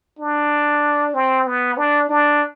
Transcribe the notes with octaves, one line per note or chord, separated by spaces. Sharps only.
D4
C4
B3
D4
D4